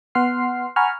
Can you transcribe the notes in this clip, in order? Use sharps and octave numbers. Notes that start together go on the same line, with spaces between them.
B3 F#5 C6 F6 C7
F#5 G#5 A#5 B5 C#6 F6